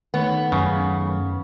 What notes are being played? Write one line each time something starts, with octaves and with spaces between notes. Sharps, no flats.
D#3 A3 B3 C#5
F#2 C#3